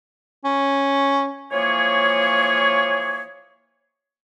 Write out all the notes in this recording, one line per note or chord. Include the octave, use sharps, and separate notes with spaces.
C#4
E3 F3 A#3 G#4 C#5